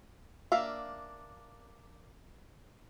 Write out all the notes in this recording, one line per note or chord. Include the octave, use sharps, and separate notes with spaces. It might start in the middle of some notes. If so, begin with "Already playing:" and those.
A#3 D4 E5 F5